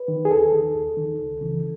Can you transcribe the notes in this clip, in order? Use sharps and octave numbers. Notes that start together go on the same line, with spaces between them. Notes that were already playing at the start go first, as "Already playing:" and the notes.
Already playing: B4
D#3
G#4
D#2 A4
D#3
D#2
D#3
C#2
C#3 E3